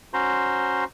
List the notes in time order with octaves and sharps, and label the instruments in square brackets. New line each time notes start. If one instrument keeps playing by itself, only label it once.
[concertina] C#4 F#4 C5 A#5 C6